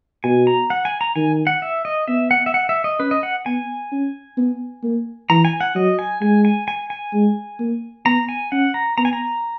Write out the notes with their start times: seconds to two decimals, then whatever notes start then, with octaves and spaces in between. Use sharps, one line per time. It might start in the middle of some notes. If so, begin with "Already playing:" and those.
0.24 B2 G#5
0.47 A#5
0.70 F#5
0.85 G#5
1.01 A#5
1.16 D#3 G#5
1.47 F#5
1.62 E5
1.85 D#5
2.08 B3 E5
2.31 F#5
2.46 E5
2.54 F#5
2.69 E5
2.84 D#5
2.99 C#4 B4
3.11 D#5
3.23 F#5
3.46 B3 G#5
3.92 C#4
4.37 B3
4.84 A#3
5.30 E3 A#5
5.45 G#5
5.61 F#5
5.75 F#3 D#5
5.99 G#5
6.21 G#3 G#5
6.45 G#5
6.68 G#5
6.90 G#5
7.13 G#3
7.60 A#3
8.06 B3 A#5
8.29 G#5
8.52 C#4 F#5
8.74 A#5
8.98 B3 A#5
9.05 G#5
9.13 A#5